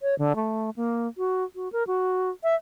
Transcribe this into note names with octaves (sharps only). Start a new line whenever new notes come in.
C#5
D3
A3
A#3
F#4
F#4
A#4
F#4
E5